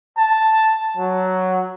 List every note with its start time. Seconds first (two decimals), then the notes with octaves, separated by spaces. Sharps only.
0.17 A5
0.97 F#3